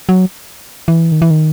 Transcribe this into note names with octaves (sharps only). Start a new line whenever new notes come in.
F#3
E3
D#3
E3
D#3